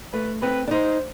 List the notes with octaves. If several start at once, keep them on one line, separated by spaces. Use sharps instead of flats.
A3 B4
C4 B4
D4
D#4 C5